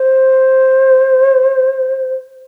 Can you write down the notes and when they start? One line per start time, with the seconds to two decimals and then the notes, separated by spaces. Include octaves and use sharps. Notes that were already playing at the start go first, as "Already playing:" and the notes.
Already playing: C5